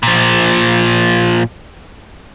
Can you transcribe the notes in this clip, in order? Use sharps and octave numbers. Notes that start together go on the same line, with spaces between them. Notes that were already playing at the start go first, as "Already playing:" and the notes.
A#2 F3